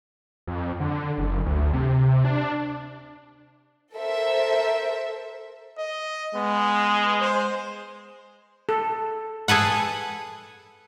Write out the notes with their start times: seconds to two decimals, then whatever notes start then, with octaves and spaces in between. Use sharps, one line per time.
0.47 F2
0.80 D3
1.18 F#1
1.46 D2
1.73 C3
2.25 D4
3.94 A4 A#4 C5 E5
5.78 D#5
6.35 G#3 B3
7.20 C5
8.69 A4
9.48 G#4 A4 B4 F#5